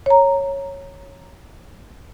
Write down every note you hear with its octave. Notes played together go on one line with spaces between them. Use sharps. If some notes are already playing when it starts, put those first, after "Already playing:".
C#5 A#5